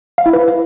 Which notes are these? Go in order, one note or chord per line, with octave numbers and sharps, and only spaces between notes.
F5
E4
B4